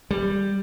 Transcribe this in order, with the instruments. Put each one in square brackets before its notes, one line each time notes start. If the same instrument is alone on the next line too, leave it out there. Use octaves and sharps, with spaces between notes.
[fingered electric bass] G3